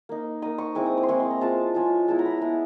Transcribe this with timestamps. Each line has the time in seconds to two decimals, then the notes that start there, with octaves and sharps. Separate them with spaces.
0.09 A#3 D#4
0.42 A#3 D#4 D#6
0.58 C#6
0.75 G#3 C4 E4 D6
0.86 D#6
0.97 D6
1.03 C6
1.08 G#3 C4 E4 C#6
1.20 C6
1.31 A#5
1.41 G#3 C#4 F4 A5
1.75 G#3 C#4 F4
2.08 G#3 B3 E4 A5
2.19 A#5
2.25 B5
2.31 A#5
2.41 G#3 B3 E4